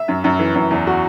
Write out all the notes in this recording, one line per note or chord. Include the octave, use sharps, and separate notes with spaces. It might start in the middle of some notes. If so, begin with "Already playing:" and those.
Already playing: E5
F#2
F#2
E3
F#2
E2
F#4